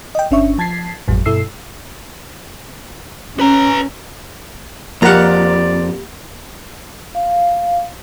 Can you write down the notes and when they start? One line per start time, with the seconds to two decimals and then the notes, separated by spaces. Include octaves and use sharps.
0.15 D#5 G5
0.31 G1 C#4 D4 E5 C#6
0.58 F3 A5 G#6 A6 B6 C7
1.08 G#1 F2 A2 F#3 G#3
1.26 G2 B2 E4 A4 E6 C7
3.40 C#4 B4 A#5
5.02 F2 A#3 G4 A#4 D5 F#5 A#5
7.15 F5